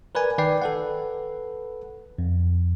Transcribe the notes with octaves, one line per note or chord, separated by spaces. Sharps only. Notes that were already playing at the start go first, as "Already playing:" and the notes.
A#4 B4 D5 G#5
D#3 B4 D5 G5 C7
A4 B4 F#5
F2